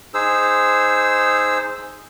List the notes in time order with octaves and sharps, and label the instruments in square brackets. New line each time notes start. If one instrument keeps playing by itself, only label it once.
[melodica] D#4 G#4 C5 E6